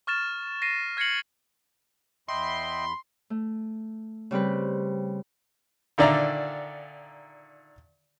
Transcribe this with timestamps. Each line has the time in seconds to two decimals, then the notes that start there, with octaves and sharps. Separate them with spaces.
0.07 C#6 F6 A6 E7
0.62 A#6 C7 D#7
0.97 F6 G#6 A#6 C7 C#7 F#7
2.28 E2 D#5 E5 G5 B5 C6
3.30 A3
4.31 C#3 G3 C4 B4
5.98 A#2 D3 D#3 D5 E5 A#5